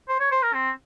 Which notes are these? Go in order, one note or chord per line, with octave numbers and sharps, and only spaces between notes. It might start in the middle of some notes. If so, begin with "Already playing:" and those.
C5
C#5
C5
A#4
C4